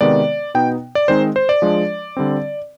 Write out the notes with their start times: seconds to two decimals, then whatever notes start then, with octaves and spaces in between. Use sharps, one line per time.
0.01 C3 D#3 G#3 B3 D5
0.54 B2 B3 D#4 G5
0.95 D5
1.08 D#3 G#3 C4 D#4 C5
1.36 C5
1.49 D5
1.62 F3 G#3 D4
2.17 D3 G3 C4